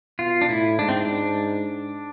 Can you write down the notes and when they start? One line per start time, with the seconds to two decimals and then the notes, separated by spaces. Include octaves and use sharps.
0.19 B2 F4
0.41 D4
0.49 A2 E4
0.79 G#2 D4
0.89 C4
0.97 D4